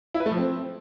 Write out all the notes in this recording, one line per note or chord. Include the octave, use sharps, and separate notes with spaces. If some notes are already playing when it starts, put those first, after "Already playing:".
E4
B4
A3
F3
C4